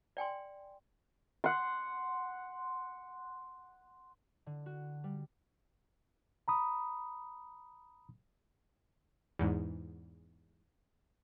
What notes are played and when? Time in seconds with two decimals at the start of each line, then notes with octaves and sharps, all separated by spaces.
0.17 D5 G5 G#5 C6
1.44 F#5 C6
4.46 D3
4.66 F#4
5.04 G3
6.48 A#5 B5 D#6
9.39 E2 G#2